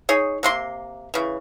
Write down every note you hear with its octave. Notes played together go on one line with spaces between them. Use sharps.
D#4 G#4 C#5
C3 A#3 C6
C#3 E3